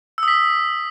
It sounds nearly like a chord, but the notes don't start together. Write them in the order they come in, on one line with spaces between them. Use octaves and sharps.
E6 D#6 B6